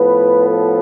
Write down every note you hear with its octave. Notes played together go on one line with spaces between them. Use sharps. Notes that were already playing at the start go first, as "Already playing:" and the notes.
Already playing: A2 F3 B3 B4
A4